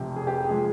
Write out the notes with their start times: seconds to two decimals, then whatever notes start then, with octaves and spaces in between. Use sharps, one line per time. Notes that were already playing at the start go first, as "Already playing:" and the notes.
Already playing: F1 F2 C3 G4
0.16 G#4
0.27 G4
0.49 F3 G#3 G#4